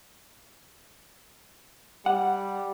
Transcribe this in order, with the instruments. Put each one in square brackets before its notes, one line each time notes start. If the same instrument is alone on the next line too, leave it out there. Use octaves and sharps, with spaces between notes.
[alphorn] G3 [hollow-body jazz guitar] F#5